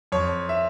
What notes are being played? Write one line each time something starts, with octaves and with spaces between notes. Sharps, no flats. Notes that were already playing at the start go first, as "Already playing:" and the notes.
F2 C#5
E5